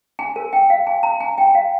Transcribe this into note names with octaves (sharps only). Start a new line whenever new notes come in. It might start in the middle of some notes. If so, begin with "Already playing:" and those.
G#5
A#4
G5
F5
G#5
A#5
G#5
G5
F5